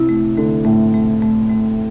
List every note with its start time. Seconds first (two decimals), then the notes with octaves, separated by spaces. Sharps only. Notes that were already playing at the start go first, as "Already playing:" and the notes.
Already playing: C3 E4
0.09 A3
0.37 D3 A3
0.65 A2 A3
0.94 A3
1.22 A3
1.50 A3